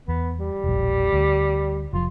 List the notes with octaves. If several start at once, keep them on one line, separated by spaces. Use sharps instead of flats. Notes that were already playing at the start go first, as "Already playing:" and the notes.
E2 B3
G3
E1 A#1
D2
F1 F3 F4